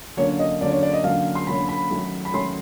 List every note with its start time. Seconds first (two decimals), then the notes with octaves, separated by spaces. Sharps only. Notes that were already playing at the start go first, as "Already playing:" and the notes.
0.17 D3 F#3 A#3 C#4 C#5
0.39 D#5
0.61 D3 F#3 A#3 C#4 D5
0.72 C#5
0.83 D5
0.93 D#5
1.04 D3 F#3 A#3 C#4 F5
1.35 C6
1.47 D3 F#3 A#3 C#4 B5
1.69 B5
1.90 D#3 F#3 A3 C#4
2.25 B5
2.33 D#3 F#3 A3 C#4 C6